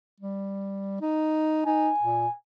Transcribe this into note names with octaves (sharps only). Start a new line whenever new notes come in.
G3
D#4
D#4 G#5
A#2